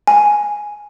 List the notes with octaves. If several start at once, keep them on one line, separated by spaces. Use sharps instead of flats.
G#5